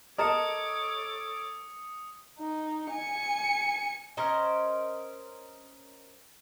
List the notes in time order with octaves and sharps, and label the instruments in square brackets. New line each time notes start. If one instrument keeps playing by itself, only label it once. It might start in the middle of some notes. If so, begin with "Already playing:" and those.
[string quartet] A4 C#5 D6 [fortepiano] A#4 A5 [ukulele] D#5 [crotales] D#6 C#7
[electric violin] D#4
G#5 C#7
[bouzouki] C#4 A#4 C5 D#5